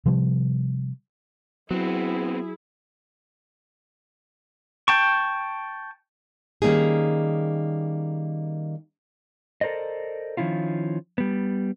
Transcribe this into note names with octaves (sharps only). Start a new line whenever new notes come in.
C3 F3 G3
F#3 B3 C4 E4 G#4
G5 A5 C#6
D#3 G3 A#3 C#4 D#4 G#4
A4 A#4 C5 D5 D#5
D#3 F3 C#4 E4 F4
G3 B3